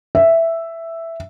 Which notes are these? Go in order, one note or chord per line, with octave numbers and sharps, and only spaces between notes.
E5